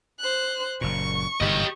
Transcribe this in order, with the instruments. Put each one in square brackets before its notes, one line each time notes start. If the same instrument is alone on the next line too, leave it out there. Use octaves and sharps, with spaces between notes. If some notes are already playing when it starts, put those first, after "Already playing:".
[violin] C5 F#6
[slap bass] F#1 A#2 [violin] C#6
[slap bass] G1 G#2 C3 [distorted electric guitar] G4 D#5